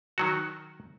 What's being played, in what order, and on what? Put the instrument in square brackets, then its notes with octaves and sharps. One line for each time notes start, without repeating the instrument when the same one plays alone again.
[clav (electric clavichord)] D#3 F#3 F#4